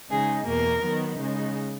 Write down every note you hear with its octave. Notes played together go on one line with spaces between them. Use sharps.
C#3 G#3 D#4 G#4
E2 B2 A#3 A#4
D#3 F#3 B3
C#3 G#3 D#4